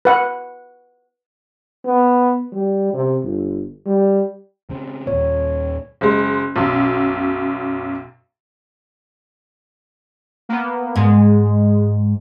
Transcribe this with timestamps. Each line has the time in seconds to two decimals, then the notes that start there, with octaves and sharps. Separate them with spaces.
0.05 B4 F#5
1.86 B3
2.53 G3
2.94 C3
3.24 G1
3.86 G3
4.70 C#3 C4
5.07 D#2 A#2 C#5
6.01 F#1 G#3
6.56 B1 F#2
10.49 A#3 B3
10.96 G#2 G#3